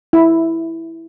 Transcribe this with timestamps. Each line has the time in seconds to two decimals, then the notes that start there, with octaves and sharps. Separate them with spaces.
0.13 E4